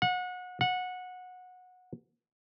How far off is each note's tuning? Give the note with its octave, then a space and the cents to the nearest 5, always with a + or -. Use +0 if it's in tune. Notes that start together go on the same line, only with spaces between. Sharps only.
F#5 -30
F#5 -20